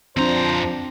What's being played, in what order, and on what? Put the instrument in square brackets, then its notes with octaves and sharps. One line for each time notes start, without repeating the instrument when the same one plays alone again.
[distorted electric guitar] F2 A#5 [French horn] F3 [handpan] C4 D4 [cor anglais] C5